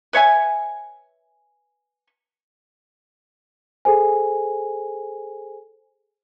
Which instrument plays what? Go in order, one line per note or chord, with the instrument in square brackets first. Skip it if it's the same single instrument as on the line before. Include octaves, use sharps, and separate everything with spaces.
[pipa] B4 C#5 E5 G#5
[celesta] G#4 A4 C5 G#5